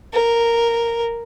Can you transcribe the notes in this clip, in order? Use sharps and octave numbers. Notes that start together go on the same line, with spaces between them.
A#4